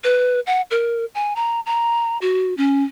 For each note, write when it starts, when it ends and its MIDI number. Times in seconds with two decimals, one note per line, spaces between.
0.04 0.40 71
0.47 0.61 78
0.71 1.05 70
1.15 1.34 80
1.36 1.60 82
1.66 2.18 82
2.22 2.56 66
2.57 2.84 61